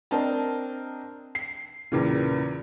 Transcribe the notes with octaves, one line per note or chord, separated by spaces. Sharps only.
C4 D4 A#4 D#5 A5
C7
E2 A#2 C#3